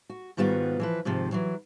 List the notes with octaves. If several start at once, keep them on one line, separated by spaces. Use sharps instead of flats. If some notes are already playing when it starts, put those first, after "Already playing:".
F#4
G#2 D#3 G3 B3 F4 F#4
E3 F3 B4
G#2 C3 D#3 F3
E3 F#3